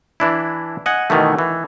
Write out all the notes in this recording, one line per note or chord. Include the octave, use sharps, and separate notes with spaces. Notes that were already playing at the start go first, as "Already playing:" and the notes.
E3 D4 E4
D#5 F#5 G#5
B2 D#3 E3 A3
E3